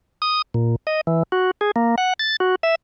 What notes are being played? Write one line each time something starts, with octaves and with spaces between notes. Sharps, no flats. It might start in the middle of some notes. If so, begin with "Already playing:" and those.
D#6
A#2
D#5
E3
F#4
G#4
A#3
F#5
A6
F#4
E5